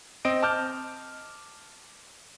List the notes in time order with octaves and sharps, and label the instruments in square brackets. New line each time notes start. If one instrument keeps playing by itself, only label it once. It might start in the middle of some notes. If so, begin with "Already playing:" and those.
[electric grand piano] C4 D#5 D7
A5 D6 F6 G6